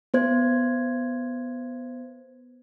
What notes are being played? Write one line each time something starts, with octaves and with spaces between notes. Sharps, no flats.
B3 C5 G#6